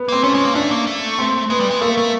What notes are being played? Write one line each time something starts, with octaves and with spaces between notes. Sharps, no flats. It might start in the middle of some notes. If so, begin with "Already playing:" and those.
Already playing: B3
A#3 C4
A3 C#4
G#3
A#3
A3 D4
A#3
A3
C4
G#3 B3
G3
G#3
A3 A#3
A3